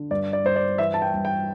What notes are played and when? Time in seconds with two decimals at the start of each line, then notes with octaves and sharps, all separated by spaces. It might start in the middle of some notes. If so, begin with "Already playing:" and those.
Already playing: D3
0.11 G2 D5
0.33 D5
0.44 G2 C5
0.56 D5
0.78 E3 E5
0.94 A5
1.02 G5
1.13 G2
1.25 G5